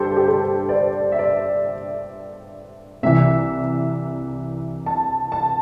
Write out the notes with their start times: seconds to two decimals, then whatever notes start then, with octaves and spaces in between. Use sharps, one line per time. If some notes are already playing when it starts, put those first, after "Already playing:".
Already playing: G2 D3 G4 A4 C5
0.17 G4
0.28 A4
0.69 D5
0.74 C5
1.12 E5
1.19 D5
3.03 C2 C3 E3 E5
4.86 A5
5.32 A5